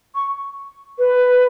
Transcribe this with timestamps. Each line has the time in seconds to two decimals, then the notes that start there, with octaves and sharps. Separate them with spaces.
0.15 C#6
0.99 B4